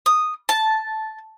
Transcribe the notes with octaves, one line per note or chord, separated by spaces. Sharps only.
D#6
A5